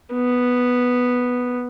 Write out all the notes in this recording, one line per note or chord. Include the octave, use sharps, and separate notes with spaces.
B3